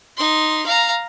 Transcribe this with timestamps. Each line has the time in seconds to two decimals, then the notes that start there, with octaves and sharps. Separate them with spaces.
0.17 D#4 C6
0.66 F5 A#5